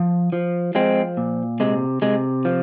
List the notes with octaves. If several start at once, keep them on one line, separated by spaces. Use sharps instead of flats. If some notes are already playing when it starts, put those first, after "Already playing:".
Already playing: F3
F3
F3 G#3 C4
A#2
C3 G#3
C3 G#3
F3